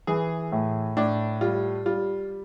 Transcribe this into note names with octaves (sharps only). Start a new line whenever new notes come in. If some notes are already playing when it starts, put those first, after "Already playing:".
E3 G#4
A2
A2 D4
G3 F4
G3 F4